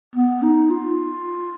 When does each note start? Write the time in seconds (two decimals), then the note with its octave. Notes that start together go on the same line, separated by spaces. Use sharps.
0.16 B3
0.43 D#4
0.70 F4